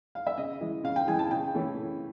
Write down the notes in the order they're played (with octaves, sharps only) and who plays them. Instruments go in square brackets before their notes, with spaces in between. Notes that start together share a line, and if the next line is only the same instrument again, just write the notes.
[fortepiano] F5
E5
C#3 D#5
E3 G#3
C#3 F5
G5
E3 G#3 G#5
A5
C#3 G5
E3 A3 C#4 E4
C#3